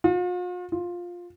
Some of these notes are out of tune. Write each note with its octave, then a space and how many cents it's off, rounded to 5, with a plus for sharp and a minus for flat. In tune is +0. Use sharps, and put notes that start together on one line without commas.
F4 +45
F4 +10